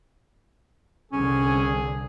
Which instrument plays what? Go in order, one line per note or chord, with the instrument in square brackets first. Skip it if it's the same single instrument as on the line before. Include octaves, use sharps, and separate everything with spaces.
[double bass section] C2 D3 [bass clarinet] C#4 [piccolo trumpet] G#4